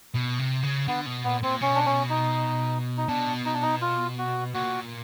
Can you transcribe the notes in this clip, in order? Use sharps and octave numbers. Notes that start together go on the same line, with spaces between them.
B2
C3
C#3
D3 B3
B2
A#2 B3
A#2 C4
B2 C#4
D4
C#4
D#4
D#4
B2 D4
D#4
D4
D#4
F4
F#4
A#2 F#4